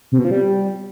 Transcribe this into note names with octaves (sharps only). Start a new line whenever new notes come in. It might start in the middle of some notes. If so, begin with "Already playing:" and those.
C3
B2
F3
G3